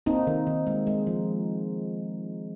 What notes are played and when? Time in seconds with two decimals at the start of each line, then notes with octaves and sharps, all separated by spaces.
0.06 A#3 C4 D#4
0.27 D#3
0.47 D#3
0.67 G#3
0.87 G#3
1.07 F3